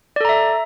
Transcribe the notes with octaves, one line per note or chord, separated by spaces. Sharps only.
A4 D5 E5 A#5